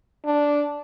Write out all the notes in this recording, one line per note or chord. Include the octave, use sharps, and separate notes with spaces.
D4